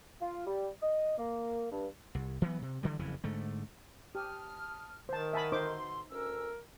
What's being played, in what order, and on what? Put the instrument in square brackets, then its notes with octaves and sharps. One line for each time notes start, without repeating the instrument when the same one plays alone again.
[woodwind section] F4
G3
D#5
A#3
G2
[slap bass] C2
E3 F#3 A3 B3
C3
D3 E3 G3
F#1 F2 C#3 E3
G#2 D3 A3
[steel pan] G4 [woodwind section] A5 D#6 F6
[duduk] D#3 [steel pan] C5 A5
[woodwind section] D#5 F#5 G#5 [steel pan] E5 A5 B5
[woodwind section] B2 D3 C6 [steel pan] D#4 C5 D6
[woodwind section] D2 C#4 E6 [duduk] A#4